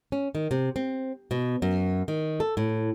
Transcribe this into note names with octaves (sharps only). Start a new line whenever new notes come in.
C#4
D#3
C3
C4
B2
F#2
D#3
A4
A2